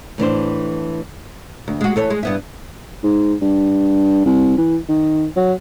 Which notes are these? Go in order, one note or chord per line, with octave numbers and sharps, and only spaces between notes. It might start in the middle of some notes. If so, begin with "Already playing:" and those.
A2 E3 D4 C5
D2
G#3 F#4
E3 A4 C#5
G#3
G2 B3 E4
G#2
G2
C2
E3
D#3
F#3